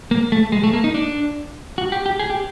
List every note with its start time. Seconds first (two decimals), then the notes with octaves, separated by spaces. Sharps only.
0.11 A#3
0.32 A3
0.52 G#3
0.64 A3
0.73 A#3
0.84 D#4
0.94 D4
1.78 F#4
1.92 G4
2.06 G4
2.19 G#4
2.30 G4